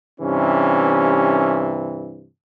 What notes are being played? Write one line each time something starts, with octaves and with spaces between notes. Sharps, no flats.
G2 C3 E3 C#4